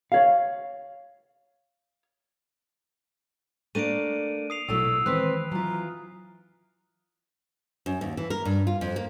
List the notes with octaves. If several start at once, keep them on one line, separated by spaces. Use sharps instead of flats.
C#5 F5
A3 A#3 D4 D7 D#7
D#6 C7 F7
A#1 B2 F#3 A3 E4 E6
D#3 E3 G#3 C4 B4 F#6
E3 F#3 F4 A#5
F#2
D#2
E3
A#4
G2
F4
F2
A#3